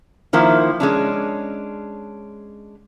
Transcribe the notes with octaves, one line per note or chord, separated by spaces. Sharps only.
D#3 F3 A#3 E4
G#3 C#4 D4